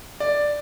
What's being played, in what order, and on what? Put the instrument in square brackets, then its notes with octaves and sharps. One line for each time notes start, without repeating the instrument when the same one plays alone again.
[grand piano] D5